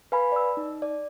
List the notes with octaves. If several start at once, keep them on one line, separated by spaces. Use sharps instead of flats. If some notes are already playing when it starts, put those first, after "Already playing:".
B4 F5 G#5 B5
D5 E6
D#4
D5